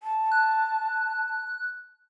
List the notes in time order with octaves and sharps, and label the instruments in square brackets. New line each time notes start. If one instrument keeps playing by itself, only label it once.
[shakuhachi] A5
[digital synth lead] F#6